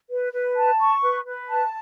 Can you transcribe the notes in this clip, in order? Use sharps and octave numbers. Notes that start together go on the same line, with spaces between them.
B4
B4
A5
C#6
B4
B4
A5